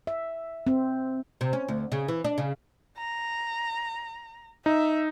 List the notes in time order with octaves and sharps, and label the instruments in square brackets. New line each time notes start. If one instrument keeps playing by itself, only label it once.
[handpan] E5
C4
[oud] C3
C#4
D2
C#3
E3
D4
C#3
[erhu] A#5
[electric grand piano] D#4 [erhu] E5